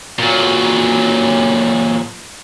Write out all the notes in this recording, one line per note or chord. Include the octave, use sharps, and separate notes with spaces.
A#2 F#3